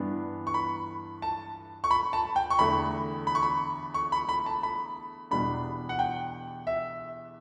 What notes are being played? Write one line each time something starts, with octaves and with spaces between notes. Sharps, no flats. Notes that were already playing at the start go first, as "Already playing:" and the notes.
Already playing: G2 E3 B3 D4
C#6
B5
A5
C#6
B5
A5
G5
C#6
E2 D3 A3 B5
B5
C#6
B5
C#6
B5
B5
A5
B5
E2 B2 G3 D4 B5
F#5
G5
E5